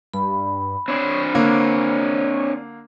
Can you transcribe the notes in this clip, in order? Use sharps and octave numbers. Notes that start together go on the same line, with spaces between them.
G2 B5
C4 D4 C5 C#5
D3 A#3 C#5